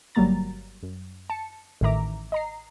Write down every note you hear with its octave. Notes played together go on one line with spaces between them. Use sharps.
G1 F#3 G3 A#3 A#5 A6
F#2
A5 C#7
A1 A2 D#3 E5 A#5 D6
D#5 A#5 C7